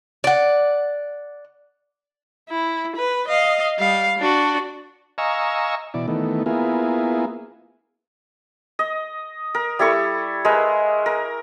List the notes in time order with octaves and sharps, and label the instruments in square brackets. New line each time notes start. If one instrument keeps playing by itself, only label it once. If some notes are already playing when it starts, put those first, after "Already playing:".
[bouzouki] D5 F#5
[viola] E4
B4
D#5 F5
G3 F5
D4 F#4
[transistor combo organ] D#5 F5 G#5 A#5 C#6 E6
B2 E3 D5
D#3 E3 A3 B3
A#3 B3 E4 F4 G#4
[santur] D#5
A#4
G3 E4 A4 C#6
G#3 A#4 B4
A#4